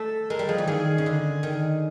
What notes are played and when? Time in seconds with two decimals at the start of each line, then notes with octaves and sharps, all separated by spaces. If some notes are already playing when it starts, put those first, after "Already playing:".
Already playing: A3 A4
0.30 G#3 A#4
0.39 G3
0.49 F3 G#4
0.58 E3
0.68 D#3 G#4
0.98 C#3
1.06 D3
1.43 D#3